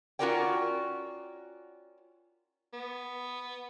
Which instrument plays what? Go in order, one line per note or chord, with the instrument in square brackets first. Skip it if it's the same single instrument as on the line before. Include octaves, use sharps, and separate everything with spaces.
[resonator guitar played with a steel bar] C#4 F4 F#4 A#4 D5 G5
[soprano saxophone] B3